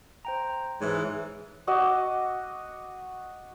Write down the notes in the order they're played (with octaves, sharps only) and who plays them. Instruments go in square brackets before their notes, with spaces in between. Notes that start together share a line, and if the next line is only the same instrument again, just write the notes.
[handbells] C5 G5 A#5
[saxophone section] G#2 E3 [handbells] G#4 C#5
[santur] F#4 D#5 D6 E6